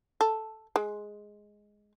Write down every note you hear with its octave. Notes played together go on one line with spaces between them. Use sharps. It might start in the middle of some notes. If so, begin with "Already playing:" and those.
A4
G#3